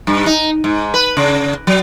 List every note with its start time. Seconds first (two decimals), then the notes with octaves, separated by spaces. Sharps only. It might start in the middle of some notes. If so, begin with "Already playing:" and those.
0.07 G2
0.26 D#4
0.64 G#2
0.94 B4
1.17 C#3
1.67 F#3